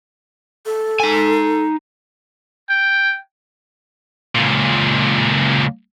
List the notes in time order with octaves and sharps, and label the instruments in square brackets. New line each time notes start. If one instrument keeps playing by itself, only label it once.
[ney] A4
[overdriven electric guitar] D#4 G#5
[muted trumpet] G5
[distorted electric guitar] C#2 A#2